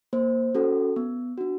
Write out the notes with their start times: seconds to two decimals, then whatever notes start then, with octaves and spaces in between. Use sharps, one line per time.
0.13 A#3 C5
0.55 C#4 F#4 A4
0.96 B3
1.38 D4 F#4